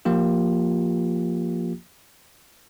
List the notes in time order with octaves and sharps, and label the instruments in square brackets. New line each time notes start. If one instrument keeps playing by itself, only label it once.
[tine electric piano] F3 A#3 F4 G4